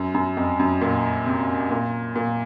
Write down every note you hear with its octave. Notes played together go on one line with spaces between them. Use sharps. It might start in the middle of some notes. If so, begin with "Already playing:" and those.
Already playing: F#2
F#2
F2
F#2
A#2
C3
A#2
A#2